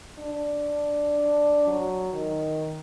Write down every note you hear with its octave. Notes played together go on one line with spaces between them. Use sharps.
D4
F#3
D#3